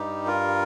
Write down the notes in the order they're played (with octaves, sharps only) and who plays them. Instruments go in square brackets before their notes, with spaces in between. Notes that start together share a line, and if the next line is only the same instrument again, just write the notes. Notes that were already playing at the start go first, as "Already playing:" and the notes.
Already playing: [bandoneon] G2 G3 D#4 G4
F4 A#4